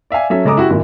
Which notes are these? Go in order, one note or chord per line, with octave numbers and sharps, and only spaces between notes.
D5 E5 F5 G#5
F#3 C#4 A4 E5
C#3 G#3 A4 A#5 D6 D#6
E4 F#4 G4
G#1 F#2 A#2